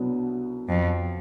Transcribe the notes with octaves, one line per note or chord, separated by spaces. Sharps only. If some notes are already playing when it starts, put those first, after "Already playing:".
Already playing: C2 B2 F#3 B3 D4
F2